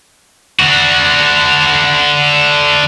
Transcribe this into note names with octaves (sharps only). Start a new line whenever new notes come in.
D3 F#4